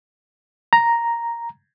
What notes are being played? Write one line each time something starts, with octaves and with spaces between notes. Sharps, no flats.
A#5